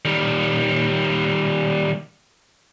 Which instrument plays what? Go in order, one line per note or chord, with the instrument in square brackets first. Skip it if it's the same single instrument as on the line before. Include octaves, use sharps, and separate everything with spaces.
[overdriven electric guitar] D#3 G3